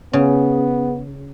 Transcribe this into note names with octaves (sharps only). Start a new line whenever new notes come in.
C#3 B3